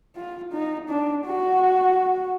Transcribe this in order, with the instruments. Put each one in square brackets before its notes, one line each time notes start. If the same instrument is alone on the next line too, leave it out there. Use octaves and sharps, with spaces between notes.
[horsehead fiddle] F4
D#4
D4
F#4